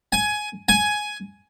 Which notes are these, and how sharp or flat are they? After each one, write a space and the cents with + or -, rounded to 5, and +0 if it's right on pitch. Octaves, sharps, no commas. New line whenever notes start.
G#5 +15
G#5 +10